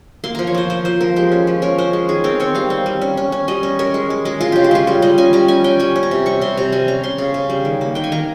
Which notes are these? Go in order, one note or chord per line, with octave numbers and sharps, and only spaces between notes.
A#3 C6
F3 A#5
C#5
F3 C5
F3 C5
F3 C5
F3 A#4
G#3 G4
C#4
F3
C#4 A#4
C#4 C5
G#3
D#3 G#4
C4 A#4
C4 C#5
G3 F5
C4
G3
C#4
C#4
C#4
G3 D#5
C#4
C#4 A#4
G#3
G#3
G#3
G#3 F4
C#3 G4
G4
G#3 F4
G3 F4
G3 D#5
C#4 G#5
G3 A#5
C#4 G#5
C#4 G5
G3 G#5
C#4
A#5
C3
G3 C#6
C3 C6
C3 A#5
G3 G#5
C#4 A#5
C#4 C6
C#3
C#3
G3
D#3
A#3
D#3 G5
G#5
D#3 A#5